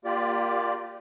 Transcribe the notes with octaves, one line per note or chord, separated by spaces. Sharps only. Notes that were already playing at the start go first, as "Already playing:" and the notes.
A#3 F4 G4 D5